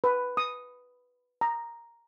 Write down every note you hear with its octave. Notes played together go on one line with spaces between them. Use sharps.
B4
D#6
A#5